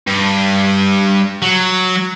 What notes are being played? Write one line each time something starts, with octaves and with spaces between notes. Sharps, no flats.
G2
F#3